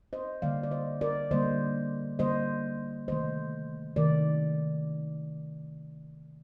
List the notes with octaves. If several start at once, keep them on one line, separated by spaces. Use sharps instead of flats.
C5 D#5
D3 G3 A#3 D5 F5
D5
C5 D#5
A#4 D5
D3 G3 A#3 C5 D#5
D3 G3 A#3 C5 D#5
C3 D#3 A3 C5 D#5
C3 D#3 A3 A#4 D5